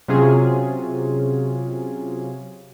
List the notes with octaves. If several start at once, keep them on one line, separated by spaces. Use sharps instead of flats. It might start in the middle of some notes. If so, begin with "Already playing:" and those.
C3 F#3 C#4 F4 G#4